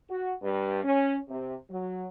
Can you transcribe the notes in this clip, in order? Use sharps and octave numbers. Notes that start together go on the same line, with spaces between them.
F#4
G2
C#4
C3
F#3